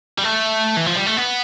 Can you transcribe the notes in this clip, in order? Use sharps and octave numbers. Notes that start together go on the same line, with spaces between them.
G3
A3
E3
F3
G3
A3
B3